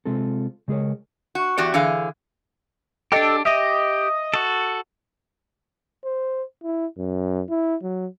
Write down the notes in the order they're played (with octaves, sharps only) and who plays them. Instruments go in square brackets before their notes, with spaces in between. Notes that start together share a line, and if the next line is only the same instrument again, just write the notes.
[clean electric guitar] C3 G#3 C4 F4 A4
C#3 G#3 G#4 A#4 C#5
[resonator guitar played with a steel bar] F#4
E2 F#4 G4 D5
D3 E3 G#4 F5
[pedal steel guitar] D4 G4 [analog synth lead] A4 [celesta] D#5 G5
[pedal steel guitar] G4 [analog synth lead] D#5 [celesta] E5 D#6 A#6
[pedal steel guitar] F#4 A4
[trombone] C5
E4
F#2
E4
F#3